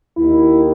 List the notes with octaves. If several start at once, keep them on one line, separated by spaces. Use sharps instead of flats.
D#2 D#3 E4